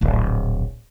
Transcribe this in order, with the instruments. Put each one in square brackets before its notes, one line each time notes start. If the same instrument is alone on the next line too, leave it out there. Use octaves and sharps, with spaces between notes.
[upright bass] D1 A#1